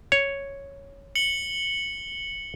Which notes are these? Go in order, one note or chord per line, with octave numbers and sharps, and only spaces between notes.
C#5
C#7 F#7 G7